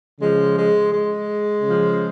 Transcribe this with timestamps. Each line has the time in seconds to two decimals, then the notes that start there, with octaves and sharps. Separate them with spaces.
0.19 C#3 F3 G#3
0.55 G#3
0.91 G#3
1.62 C#3 F3